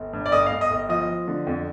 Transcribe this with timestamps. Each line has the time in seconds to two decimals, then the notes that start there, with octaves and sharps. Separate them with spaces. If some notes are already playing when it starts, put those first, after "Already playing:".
Already playing: G1
0.13 G2
0.26 D5
0.32 G1 D#5
0.46 F5
0.52 G1
0.61 D#5
0.71 G1
0.89 F3 D#5
1.08 F3
1.28 D3
1.47 F2